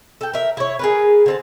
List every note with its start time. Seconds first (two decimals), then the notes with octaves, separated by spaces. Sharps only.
0.21 A4 G5
0.33 A#4 E5
0.57 E4 C#5
0.79 G#4 A#4 B4
1.26 D3 C4 A5